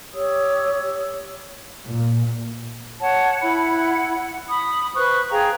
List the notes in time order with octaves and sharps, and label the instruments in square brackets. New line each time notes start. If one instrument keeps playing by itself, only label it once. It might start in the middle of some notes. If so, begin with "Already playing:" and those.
[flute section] G4 C#5 D#6 E6
[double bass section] A#2
[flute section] C#5 F#5 A5
E4 F#5 B5
B5 D#6
B4 C5 C#6 F#6
G#4 F5 G5 A#5